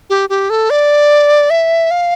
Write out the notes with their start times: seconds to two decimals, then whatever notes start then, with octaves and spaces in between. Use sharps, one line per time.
0.10 G4
0.30 G4
0.50 A4
0.70 D5
1.50 E5
1.91 F5